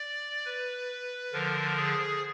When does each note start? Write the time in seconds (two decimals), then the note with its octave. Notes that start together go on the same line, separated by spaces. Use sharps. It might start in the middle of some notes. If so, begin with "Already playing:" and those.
Already playing: D5
0.46 B4
1.33 D3 F3 A#4
1.77 G#4